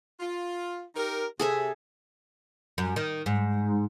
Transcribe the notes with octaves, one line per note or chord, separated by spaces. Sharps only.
F4
D#4 G4 A#4
C3 G#4 A4 E5
F#2
D#3
G#2